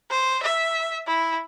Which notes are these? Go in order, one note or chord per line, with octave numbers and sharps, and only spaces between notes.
C5
E5
E4